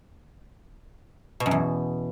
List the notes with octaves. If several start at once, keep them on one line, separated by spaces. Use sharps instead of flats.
B2
F#2
E2